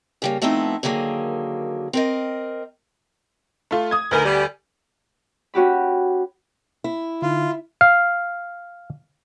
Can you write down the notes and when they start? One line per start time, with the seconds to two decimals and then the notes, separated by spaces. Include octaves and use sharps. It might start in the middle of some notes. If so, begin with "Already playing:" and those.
0.22 C#3 G3 A#3
0.42 F3 A3 B3 C4 D#4 E4
0.83 D3 D#3 F#3 A#3 G#4
1.93 C4 A#4 D#5
3.71 A3 F4
3.91 D#6 G#6
4.11 D2 D#4 A#4 B4 G#5
4.23 G3
5.54 C#4 F#4 G4 B5
6.84 E4
7.22 D3 D#4 F4
7.81 F5